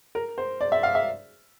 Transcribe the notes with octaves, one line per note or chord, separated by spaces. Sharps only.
A#4
C5
D5
E5
F5
E5